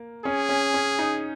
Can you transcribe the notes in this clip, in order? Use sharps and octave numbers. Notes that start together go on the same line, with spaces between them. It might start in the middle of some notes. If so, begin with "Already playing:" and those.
Already playing: A#3
C#4 G#4
C#4
C#4
D#4